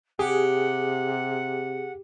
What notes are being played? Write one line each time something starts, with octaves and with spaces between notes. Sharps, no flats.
C3 G4 G#4 F#5